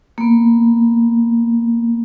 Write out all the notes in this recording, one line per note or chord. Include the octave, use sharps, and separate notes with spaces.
A#3 B3